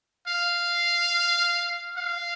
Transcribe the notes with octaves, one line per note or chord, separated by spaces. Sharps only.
F5
F5